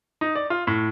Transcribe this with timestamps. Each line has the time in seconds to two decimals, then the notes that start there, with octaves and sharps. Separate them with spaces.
0.21 D#4
0.36 D5
0.50 F4
0.67 A2